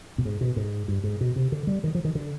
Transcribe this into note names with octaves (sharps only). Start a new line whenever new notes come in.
B2
G#2
B2
G#2
G2
G#2
B2
C3
D3
G3
D#3
F3
D#3
D3